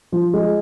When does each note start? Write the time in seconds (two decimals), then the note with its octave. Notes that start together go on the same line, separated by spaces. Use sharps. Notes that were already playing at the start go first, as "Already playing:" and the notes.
0.12 F3
0.33 G#3